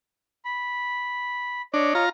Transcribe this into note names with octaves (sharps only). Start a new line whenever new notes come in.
B5
D4 C#5 D#5
F4 A#5